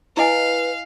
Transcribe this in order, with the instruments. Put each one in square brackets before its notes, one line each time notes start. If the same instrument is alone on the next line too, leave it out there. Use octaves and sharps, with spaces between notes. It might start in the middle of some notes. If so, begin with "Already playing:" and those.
[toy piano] E4 D#5 G#5 [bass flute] B4 [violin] F5